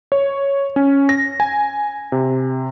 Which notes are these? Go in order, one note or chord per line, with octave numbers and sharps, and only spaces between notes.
C#5
C#4
A#6
G#5
C3